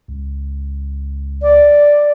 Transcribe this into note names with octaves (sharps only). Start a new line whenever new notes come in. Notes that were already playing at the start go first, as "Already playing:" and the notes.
C#2
D5